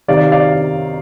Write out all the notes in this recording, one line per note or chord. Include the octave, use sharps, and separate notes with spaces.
C3 D#3 D5 F5
D5 F5